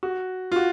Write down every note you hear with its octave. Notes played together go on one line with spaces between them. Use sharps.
F#4
F4
F#4